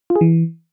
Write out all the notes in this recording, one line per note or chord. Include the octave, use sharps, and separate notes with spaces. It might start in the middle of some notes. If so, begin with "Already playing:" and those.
F4
G#4
E3